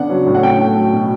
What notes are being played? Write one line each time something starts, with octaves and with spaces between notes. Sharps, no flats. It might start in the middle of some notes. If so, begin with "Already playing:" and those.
Already playing: C#3 B3 D4 F#5
F#3
A2
F#5
C#4 G5
A3
F#3
B2